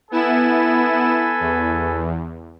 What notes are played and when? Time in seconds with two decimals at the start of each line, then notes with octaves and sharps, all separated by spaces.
0.11 B3 E4 A4 B4 G#5 E7
1.40 E2